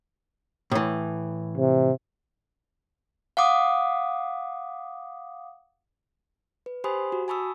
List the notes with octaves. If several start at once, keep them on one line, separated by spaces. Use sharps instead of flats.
A2 E3
C3
F5 F#5 D6 D#6
B4
G4 C5 G#5 B5 C6 D#6
F#4
G#5 A5 B5 C#6 D#6 E6